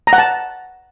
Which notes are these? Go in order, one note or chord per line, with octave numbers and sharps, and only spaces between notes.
A#5
F#5
A5